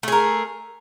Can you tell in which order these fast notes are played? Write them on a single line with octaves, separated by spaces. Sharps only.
A3 G#4 A#4